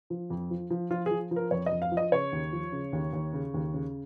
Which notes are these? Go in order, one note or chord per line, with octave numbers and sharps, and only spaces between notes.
F3
F2
F3
F3
F3 F4
F3 G#4
F3
A#4
F2 C#5
D#5
F2
F5
F3
D#5
C#3 C#5
D#2
F3
C#3
D#2
D#2
C#3
D#2
C#3